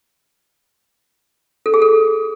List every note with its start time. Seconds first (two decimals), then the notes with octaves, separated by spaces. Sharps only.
1.66 A4
1.74 G#4
1.82 A4